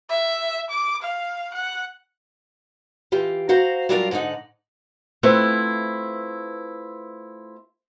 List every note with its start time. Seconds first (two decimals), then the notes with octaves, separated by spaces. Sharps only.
0.10 E5
0.70 D6
1.02 F5
1.54 F#5
3.12 E3 F4 G4
3.49 F#4 C5 F5 A#5
3.89 F#3 G3 D4 F4 A#4 F5
4.11 G#2 D3 F#3 D#4 F#5
5.23 A3 C4 E4 F4 B4